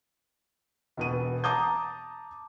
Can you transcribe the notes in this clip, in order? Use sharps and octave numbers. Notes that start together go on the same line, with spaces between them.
E1 B2 D#7
A5 A#5 D6 D#6 G6